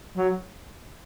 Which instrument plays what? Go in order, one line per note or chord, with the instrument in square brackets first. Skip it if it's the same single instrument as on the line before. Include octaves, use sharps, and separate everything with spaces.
[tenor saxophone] F#3